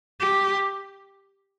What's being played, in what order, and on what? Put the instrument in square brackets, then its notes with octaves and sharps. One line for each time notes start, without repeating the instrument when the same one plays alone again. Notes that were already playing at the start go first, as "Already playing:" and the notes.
[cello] G4